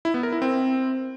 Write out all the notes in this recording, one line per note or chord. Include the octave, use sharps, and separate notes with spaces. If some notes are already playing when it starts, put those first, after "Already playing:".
E4
B3
A#4
E4
C4